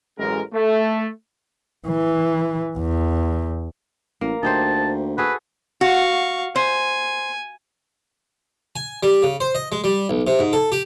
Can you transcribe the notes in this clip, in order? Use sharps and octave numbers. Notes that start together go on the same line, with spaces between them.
A1 F#2 G#3 A#4
A3
E3
E2
A1 A#3
D2 D#4 G4 C5 A5
F#4 G#4 A4 B4
F#4 F5 C#6
C5 G#5
G#5
G3
C#3
C5
D#5
G#3
G3
B1
C3
G#2
A4
G4